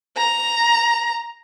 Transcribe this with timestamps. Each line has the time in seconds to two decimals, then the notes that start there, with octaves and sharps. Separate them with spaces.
0.17 A#5